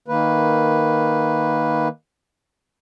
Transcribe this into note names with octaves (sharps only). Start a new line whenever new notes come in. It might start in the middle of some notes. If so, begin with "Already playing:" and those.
D#3 A#3 B4